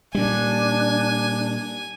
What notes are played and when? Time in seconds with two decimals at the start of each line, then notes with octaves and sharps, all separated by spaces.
0.15 A#2 G3 D4 G#5